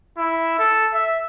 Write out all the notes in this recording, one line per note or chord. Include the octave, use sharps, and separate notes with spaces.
E4
A4
E5